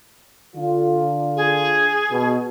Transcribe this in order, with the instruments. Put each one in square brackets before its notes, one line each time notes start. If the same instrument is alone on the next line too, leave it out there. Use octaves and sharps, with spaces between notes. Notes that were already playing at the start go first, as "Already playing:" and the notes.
[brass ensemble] D3 D4 F4
[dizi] G#4
[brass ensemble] B2